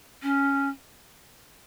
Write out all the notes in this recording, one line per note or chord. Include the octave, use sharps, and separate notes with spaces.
C#4